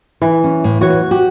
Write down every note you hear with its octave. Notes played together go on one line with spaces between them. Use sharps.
E3
C#4
A2
E3 F#4 C#5
F#4 G4